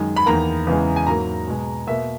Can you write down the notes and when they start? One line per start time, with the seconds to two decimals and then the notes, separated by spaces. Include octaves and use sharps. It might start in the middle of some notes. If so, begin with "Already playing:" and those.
Already playing: F#2 D#3 G#3
0.16 B5
0.26 E2 D#3 A#3 A#5
0.67 E2 C#3 E3 G#3
0.96 G#5
1.07 G#2 F#3 A#3 A#5
1.48 B2 G#3
1.87 B2 A#3 E5